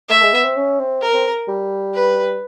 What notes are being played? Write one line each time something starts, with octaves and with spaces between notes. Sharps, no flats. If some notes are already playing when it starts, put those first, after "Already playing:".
A3 E5
G#3
B3
C4
C#4
C4
A#4
C4
G3
B4